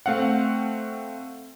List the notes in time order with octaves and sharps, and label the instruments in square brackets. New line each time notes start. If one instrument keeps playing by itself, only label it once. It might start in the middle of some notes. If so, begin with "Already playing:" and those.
[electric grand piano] A3 C4 F5 F#5